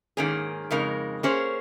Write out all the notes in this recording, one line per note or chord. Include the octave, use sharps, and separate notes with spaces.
G#2 D#3 A#3 C#4 G#4
F2 C#3 G#3 D#4 A#4
A#3 C#4 G#4 C5